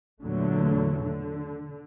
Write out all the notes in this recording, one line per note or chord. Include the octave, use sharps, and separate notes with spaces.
E2 A#2 D3 F#3 A3
D3